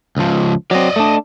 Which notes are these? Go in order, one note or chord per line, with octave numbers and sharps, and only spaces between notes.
C#2 F3
F#3 C4 D5 D#5
A3 D4